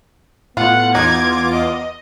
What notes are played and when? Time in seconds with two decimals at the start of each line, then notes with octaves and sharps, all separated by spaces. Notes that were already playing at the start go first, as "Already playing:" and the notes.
0.57 A2 B3 F4 F#5
0.95 E2 D#4 F4 D6 G#6
1.51 D#5